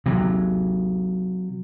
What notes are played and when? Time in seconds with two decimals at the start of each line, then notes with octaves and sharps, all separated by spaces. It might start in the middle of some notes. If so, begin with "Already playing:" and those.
0.06 C3 F#3